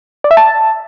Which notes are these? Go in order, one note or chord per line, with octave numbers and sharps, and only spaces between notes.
D5
E5
A5